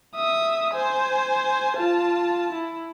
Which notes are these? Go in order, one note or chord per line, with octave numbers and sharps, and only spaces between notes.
E5 D#6
C5 G#5
F4 A5
E4